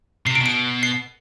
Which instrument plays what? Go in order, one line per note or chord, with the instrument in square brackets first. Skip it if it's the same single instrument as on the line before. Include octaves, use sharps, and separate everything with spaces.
[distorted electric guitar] C3 [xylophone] C7
[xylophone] D7
[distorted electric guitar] B2
[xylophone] D7
C7